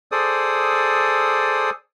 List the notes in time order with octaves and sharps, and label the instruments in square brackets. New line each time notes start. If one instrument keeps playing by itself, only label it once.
[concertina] G#4 A4 C5 D5 D#6